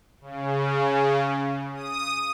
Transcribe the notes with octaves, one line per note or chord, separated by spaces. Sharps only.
C#3
D#6